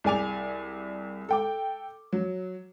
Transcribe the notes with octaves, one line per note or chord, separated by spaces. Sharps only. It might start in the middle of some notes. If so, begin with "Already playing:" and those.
C2 G#4 D5 G#5 D6 F7
A4 G5 D6
F#3